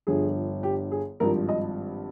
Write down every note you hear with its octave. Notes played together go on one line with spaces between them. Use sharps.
G1 G2 D3 F3 G#4
G4
G#4
G#1 G2 F3 A#4
D#5